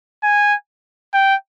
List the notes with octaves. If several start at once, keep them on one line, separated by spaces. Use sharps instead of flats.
G#5
G5